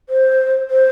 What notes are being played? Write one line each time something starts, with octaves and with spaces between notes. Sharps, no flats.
C5
C5